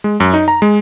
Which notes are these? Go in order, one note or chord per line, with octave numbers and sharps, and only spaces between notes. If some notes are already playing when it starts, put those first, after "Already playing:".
G#3
F#2
D#4
A#5
G#3